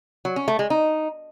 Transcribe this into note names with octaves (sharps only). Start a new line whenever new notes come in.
F#3
C#4
A3
G#3
D#4